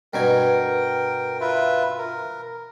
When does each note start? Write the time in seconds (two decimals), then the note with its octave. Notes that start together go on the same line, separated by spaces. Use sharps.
0.14 G2 B2 A#4 G5 G#5
1.41 F4 B4 E5
1.98 A#4